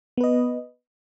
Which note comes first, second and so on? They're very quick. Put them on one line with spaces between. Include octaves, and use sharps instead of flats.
B3 B4 D#5